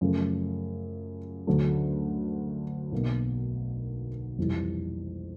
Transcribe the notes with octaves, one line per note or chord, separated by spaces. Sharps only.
F#2 C#3 F3 A3
D2 D3 F#3 A3
B1 B2 F#3 A#3
F2 C3 E3 G3